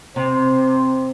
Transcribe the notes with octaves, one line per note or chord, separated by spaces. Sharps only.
C3 C5